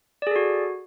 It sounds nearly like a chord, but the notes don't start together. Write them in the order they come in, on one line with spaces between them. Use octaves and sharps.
D5 G#4 A4 F#4